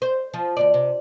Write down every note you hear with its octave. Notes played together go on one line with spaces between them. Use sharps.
C5
F3
D2 A#2 D5
C3